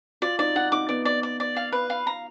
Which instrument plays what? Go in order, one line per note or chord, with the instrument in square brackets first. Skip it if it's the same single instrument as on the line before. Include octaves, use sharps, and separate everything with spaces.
[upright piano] F4 [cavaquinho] D5
[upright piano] D#4 [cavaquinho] D5
[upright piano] D#4 [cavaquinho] F#5
[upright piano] D#4 [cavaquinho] D6
[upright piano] B3 [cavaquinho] D5
[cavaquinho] D5
D5
D5
F5
B4
F5
A#5